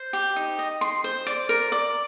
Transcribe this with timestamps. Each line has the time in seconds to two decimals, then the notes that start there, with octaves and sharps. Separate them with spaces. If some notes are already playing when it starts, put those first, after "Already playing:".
Already playing: C5
0.13 G4
0.36 D#4
0.59 D#5
0.81 C6
1.04 C5
1.27 D5
1.49 A#4
1.72 D5